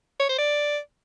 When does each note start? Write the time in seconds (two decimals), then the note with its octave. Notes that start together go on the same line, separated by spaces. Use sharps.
0.20 C#5
0.29 C5
0.38 D5